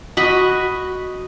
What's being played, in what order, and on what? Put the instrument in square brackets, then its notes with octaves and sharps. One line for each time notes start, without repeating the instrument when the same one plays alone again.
[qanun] F#4 D#5 B5 C#6